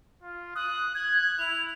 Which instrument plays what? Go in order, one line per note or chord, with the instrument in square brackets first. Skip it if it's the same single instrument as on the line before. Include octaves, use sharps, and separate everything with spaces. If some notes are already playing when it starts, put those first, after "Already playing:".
[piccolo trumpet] F4
[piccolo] D#6 [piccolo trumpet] F#6
[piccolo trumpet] F#6 [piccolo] G#6
[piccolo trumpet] E4 [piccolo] F7